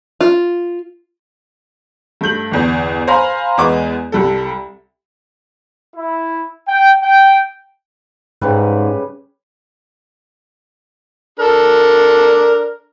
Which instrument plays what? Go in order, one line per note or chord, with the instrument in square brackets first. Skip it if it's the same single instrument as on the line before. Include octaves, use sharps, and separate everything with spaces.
[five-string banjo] F4
[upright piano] G2 A3 G6 F#7
G1 E2
C5 F5 G#5 A#5 B5
E2 G#3 B3 D6
C2 G3 A4
[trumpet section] E4
G5
G5
[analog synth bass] G#2 [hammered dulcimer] C#3 G3 B4
[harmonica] D4 A4 A#4